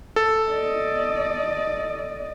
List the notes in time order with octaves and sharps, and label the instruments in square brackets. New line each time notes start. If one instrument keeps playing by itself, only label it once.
[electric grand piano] A4
[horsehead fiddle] D5 D#5